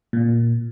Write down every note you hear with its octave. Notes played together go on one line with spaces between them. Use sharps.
A#2